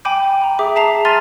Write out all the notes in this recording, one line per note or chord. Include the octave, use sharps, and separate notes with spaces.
G5 G#5 B5 D6 G6
A#5 B5
G#4 E5 D6
E5 A5 A#5 C7 F7
G#5 C6 F6 A6 D#7 F7